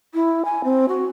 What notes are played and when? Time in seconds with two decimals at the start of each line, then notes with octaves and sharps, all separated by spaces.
0.14 E4
0.45 G#5
0.64 C4
0.88 F#4